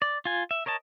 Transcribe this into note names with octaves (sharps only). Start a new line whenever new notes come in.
D5
F4 G#5
E5
A#4 C#5 D#5 A5